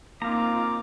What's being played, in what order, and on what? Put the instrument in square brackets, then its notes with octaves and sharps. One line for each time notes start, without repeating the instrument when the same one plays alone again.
[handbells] A#3 [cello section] C4 D#4 F4 [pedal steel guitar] F5 A#5 [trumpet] D6